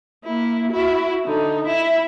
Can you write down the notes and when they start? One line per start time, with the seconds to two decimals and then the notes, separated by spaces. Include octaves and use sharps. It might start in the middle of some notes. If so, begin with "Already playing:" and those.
0.24 A#3 E4
0.72 E4 F#4
1.25 D3 D#4
1.67 E4 E5